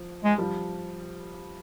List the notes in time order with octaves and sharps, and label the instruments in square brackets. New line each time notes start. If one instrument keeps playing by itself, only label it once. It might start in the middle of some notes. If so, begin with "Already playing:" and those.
Already playing: [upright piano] F3
[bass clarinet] G#3
[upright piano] F3 G3